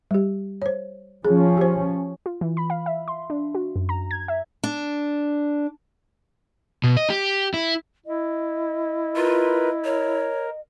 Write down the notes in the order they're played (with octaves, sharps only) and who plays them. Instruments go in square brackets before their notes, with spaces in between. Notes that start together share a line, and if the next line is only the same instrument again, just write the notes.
[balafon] G3 G4
C5 C#5
[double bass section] F3 C#4 [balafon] G#4
[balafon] G4 C5
[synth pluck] F4
E3
B5
F5
E5
C6
D4
F#4
F#2
A#5
G#6
E5
[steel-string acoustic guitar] D4
[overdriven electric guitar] B2
D#5
G4
E4
[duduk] E4 [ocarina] D#5
[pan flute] F4 [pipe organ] A#4 B4
[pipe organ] A#4 [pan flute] C#5